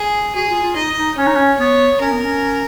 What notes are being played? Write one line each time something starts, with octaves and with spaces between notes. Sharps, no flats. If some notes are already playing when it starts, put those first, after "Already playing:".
Already playing: G#4
F#4 G#4
F4
F4
D#4 D#5
D#4
C#4 C#5
D#4
C#4
B3 C#5
C#4 A#4
B3
C#4